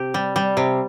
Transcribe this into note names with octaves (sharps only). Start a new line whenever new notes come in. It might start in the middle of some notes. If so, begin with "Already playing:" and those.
Already playing: C3 G4
G3
G3
C3